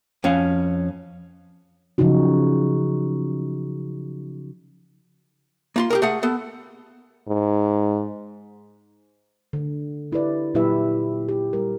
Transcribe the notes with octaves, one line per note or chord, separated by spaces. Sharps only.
F2 F3 C#4 F5
C#3 F3 F#3 D#4 F#4
A#3 F4 C6
G4 G#4 A#4
A3 G#4 F#5
B3 A4
G#2
D3
D4 E4 G4 B4 D5
A#2 F#3 E4 G4 B4 E5
G4
G3 A#4